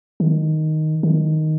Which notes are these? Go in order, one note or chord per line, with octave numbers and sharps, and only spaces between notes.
D#3
D#3